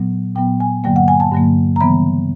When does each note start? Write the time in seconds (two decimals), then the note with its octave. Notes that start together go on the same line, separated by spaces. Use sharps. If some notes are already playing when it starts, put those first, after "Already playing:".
Already playing: A#2 F#3 B3
0.36 A#2 F#3 B3 G5
0.60 G#5
0.84 G2 D3 F#3 A#3 G5
0.96 F#5
1.08 G#5
1.20 A5
1.32 G2 D3 F#3 A#3
1.76 A#5
1.80 C#3 E3 G3 B3 B5